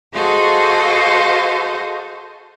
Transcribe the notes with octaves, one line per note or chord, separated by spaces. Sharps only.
F#4 G#4 A4 C5 D#5 F5